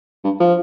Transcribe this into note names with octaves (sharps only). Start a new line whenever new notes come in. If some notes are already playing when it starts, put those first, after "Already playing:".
G2
F3